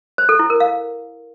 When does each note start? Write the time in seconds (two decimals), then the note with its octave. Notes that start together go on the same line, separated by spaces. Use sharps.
0.18 C5
0.29 A4
0.39 E4
0.50 A#4
0.60 F5